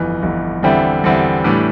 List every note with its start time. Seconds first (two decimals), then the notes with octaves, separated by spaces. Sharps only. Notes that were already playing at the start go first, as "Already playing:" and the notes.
Already playing: G1 F2 E3
0.22 G1 F2 E3
0.63 E2 D3 G3 C4 E4
1.04 E2 D3 G3 C4 E4
1.44 A2 E3 G3 D4